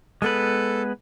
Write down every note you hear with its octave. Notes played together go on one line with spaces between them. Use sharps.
G#3 B3 A4 B4